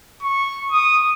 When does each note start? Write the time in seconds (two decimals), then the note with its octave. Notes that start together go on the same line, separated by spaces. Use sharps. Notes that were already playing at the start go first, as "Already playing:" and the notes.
0.23 C#6
0.72 D#6